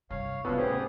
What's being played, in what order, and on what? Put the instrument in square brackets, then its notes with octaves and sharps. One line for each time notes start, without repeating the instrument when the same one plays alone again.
[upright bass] C2 G2 [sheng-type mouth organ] C#5 F5
[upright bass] G2 C3 [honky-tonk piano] B3 [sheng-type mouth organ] C#4 D4 F#4 [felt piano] F4 E6
[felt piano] A1 C5 C#5 [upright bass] D#2 [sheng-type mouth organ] G4 G#4